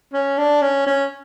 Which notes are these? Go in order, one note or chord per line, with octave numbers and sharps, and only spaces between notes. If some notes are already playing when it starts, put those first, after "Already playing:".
C#4
D4
C#4
C#4